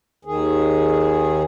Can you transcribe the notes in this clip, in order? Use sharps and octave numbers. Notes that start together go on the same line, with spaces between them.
D#2 D#3 G#4